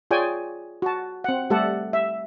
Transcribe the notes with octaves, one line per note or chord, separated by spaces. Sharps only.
F4 G#4 C#5 D5 G5 G#5
F#4 A5
C4 F#5
G3 A3 G4 A4 F#5 A5
E5